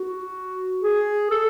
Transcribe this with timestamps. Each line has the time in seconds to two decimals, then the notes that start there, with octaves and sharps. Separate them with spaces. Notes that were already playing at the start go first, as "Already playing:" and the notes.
Already playing: F#4
0.82 G#4
1.30 A4